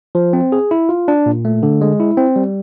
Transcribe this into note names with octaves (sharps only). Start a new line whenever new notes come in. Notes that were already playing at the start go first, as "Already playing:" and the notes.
F3
C4
G#4
E4
F4
D4
A#2
A3
D3
G#3
E4
C4
G3